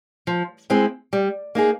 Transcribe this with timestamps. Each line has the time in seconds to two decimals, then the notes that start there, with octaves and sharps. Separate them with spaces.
0.27 F3
0.70 G#3 C4 E4 G#4
1.13 G3
1.55 A#3 D#4 G#4